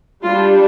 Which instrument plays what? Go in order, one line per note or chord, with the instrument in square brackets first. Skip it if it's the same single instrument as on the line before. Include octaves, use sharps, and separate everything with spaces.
[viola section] G3 D4 F4